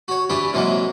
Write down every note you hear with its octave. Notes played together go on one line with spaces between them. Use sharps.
F#4 C#5
E3 D4 E4 G4 G#4
C3 E3 F#3 G#3 A#3